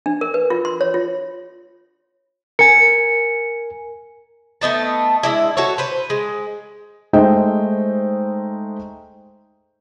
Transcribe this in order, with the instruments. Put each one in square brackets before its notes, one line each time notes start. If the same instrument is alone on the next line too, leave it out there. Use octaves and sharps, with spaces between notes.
[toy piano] D4
A#4
B4
F4
C6
C#5
F4
[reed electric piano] A#4 G#5 [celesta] C#7
[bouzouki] A3 B3 D#4 A5
G#3 D4 E4
F#4 A4 C#5
B4 C5
G#3
[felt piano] G#3 A3 D#4 C5 D#5 G5